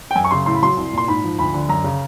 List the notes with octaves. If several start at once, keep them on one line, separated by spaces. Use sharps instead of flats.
G5
F#2 G#5
C#6
C#3 C6
A2 C6
B5
F#3 C6
C2
A#2 C6
G#2 B5
F3
D2 B5
D3
F#2 A#5
C#3